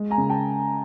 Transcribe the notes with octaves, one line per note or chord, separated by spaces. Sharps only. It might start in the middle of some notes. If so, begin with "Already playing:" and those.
Already playing: G#3
G#5 A#5
C#3
G5 A5